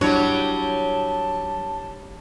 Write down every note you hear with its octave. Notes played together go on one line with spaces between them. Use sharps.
F#3 G3 D4 E4 C#5 A5